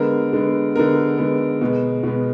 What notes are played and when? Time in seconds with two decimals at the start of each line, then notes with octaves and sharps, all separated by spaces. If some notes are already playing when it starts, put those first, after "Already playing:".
Already playing: D3 G#3 B3 A#4
0.33 D3 G#3 B3
0.76 D3 G#3 B3 A#4
1.18 D3 G#3 B3
1.61 B2 G#3 B3
2.03 B2 G#3 B3